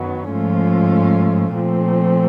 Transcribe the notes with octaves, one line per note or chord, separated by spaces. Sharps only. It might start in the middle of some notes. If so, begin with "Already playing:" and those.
Already playing: F#2 D#3 F#3 B3
G#2 F3 A3 C#4 F4
A#2 F3 A3 C4